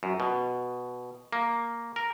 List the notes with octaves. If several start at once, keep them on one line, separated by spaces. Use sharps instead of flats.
F#2
B2
A#3
A#4